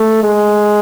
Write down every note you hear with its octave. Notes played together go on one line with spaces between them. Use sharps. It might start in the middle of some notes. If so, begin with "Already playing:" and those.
Already playing: A3
G#3